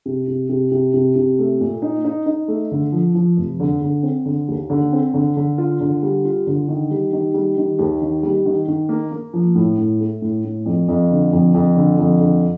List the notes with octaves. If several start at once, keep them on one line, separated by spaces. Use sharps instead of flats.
C3
C3
C3
C3
C3
C3
A3
A#2
D#4
D#4
D#4
A3
D3
F3
F3
F1
D3
D3
C4
D3
D#2
D3
C4
D3
D3
F4
D3
G3
F4
D3
D#3
G3
D#3
G3
D#3
D#2
D#3
G3
D#3
D#3
A#3
A#3
F3
A2
A2
A3
A2
A2
F2
F2
D3
F2
F2
D3
F2
D3